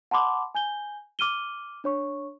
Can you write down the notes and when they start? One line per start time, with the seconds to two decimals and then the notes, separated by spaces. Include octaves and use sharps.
0.11 F#5 A5 B5 C6 D6
0.55 G#5 G6 G7
1.19 D6 F6 D#7 G7
1.84 D4 C#5 C#6